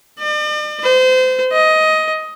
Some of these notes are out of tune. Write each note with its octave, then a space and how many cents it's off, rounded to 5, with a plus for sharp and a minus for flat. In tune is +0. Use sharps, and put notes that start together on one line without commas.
D5 +45
C5 -30
D#5 +15